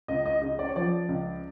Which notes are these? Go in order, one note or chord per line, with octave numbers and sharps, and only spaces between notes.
C#2 D#5
D#5
C#3 D#5
D5
C#5
F3 D5
C#2